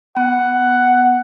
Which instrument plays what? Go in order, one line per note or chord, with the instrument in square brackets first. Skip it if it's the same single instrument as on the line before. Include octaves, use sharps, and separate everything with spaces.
[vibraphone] B3 [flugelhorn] F#5